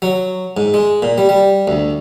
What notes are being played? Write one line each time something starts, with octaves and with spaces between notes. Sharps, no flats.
F#3
G#2
G#3
A#2
G3
G3
D2